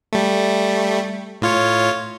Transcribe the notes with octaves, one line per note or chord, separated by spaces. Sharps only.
G3 A3
A2 F4 C#5